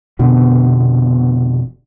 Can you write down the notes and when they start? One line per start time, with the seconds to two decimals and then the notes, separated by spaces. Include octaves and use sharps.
0.19 F1 B2 D3 B3